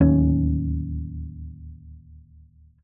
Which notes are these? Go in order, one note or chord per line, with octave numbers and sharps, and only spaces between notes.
D1 D#2 C#4